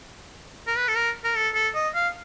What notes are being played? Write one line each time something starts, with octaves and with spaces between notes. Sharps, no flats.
A#4
B4
A4
A#4
A#4
A4
A4
D#5
F5